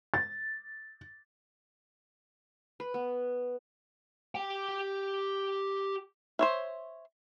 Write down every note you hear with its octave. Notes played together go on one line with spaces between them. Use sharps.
A6
B4
B3
G4 G5
C5 C#5 E5